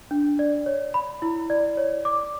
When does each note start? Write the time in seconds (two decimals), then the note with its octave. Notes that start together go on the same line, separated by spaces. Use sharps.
0.11 D4
0.39 D5
0.66 C#5
0.94 B5
1.22 E4
1.50 D5
1.77 C#5
2.05 D6